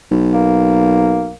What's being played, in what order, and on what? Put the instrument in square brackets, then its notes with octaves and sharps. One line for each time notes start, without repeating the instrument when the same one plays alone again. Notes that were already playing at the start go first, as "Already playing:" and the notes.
[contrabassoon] B1
[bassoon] A#3